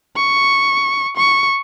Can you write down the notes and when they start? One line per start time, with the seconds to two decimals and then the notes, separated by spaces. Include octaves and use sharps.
0.17 C#6
1.17 C#6